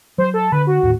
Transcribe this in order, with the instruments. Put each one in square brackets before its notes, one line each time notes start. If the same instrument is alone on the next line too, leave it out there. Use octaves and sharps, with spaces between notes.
[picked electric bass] F#3 [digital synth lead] C5
[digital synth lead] A4
[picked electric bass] D3 [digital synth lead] B4
[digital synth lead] F#4
[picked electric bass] D#2 A2